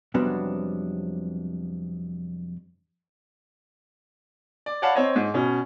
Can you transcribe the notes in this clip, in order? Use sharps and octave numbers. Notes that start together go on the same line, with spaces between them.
F2 C3 F#3 G3 B3 D4
D5
C#5 D5 F5 F#5 A5 B5
C4 C#5 D#5
G#2
B2 C#4